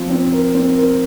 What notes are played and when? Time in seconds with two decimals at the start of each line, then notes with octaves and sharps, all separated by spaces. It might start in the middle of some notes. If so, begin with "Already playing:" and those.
Already playing: F3 C4
0.10 C4
0.32 A#4
0.54 C4
0.77 A#4